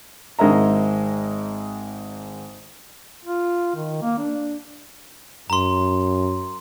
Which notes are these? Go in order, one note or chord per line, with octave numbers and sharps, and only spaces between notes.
G#1 G#2 G#3 A#4 E5 A#5
F4
D#3
A#3
D4
F#2 A#5 C6